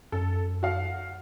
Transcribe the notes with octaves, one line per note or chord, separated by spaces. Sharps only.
F#2 A4
F#4 F5 F#5